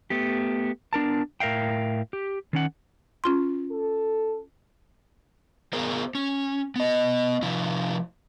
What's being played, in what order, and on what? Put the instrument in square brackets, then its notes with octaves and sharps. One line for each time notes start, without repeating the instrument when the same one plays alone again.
[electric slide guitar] A3 B3 G4
B3 D4 A#4 A5
A2 A#4 E5 F5 G5
G4
D#3 C#4 F#5
[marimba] C#4 F4 C6
[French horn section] A4
[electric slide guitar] B3 G#4 A#4 C5
C#4
B3 D#5
C3 F3 E4